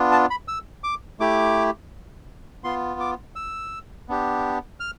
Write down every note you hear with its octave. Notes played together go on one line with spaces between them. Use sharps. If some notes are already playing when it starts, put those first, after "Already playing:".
Already playing: B3 D4 F4
A5
B5
E6
D6
A3 E4 G4 D6
B3 F4 C6
D6
E6
B3 D4 G4
F6